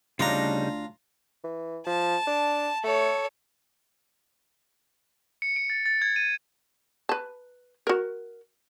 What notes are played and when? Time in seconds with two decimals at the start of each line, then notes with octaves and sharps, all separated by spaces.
0.19 D2 C#3 G3 D4 D#4 F4 A#5
1.44 E3
1.87 F3 A5
2.27 D4
2.84 A3 A4 C#5
5.42 C#7
5.56 D7
5.70 A6
5.86 A6
6.02 G#6
6.16 D#7
7.09 B4 A5
7.87 F#4 A#4